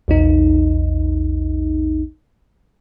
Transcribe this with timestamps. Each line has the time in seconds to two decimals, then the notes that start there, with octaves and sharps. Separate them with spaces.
0.08 A#1 E2 D#4